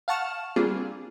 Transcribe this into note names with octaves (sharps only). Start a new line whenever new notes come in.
F5 F#5 A5 C#6 F6 E7
G3 A#3 C4 D4 F4 G#4